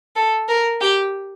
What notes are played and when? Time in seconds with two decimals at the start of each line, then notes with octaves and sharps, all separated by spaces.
0.16 A4
0.49 A#4
0.81 G4